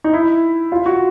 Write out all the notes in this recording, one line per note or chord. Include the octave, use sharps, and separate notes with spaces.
D#4
E4
F4
F#4